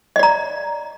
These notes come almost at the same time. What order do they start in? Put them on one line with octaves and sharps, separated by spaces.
D#5 D5 A#5